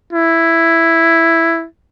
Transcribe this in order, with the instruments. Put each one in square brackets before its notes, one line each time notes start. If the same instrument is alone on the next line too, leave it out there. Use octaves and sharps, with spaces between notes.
[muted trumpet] E4